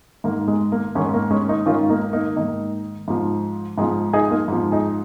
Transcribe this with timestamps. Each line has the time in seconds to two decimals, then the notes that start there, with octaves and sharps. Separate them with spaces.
0.24 G#2 D#3 A#3
0.48 G#3
0.72 A#3
0.95 G#2 D#3 G#3 C#4
1.14 A#3
1.31 G#3 C#4
1.48 A#3 D#4
1.66 G#2 D#3 C#4 F4
1.89 A#3 D#4
2.13 A#3 D#4
2.36 G#2 D#3 A#3 D#4
3.08 G#2 F3
3.78 G#2 D#4 G#4
3.82 F3
4.13 D#4 G#4
4.31 A#3 D#4
4.48 G#2 F3
4.72 D#4 G#4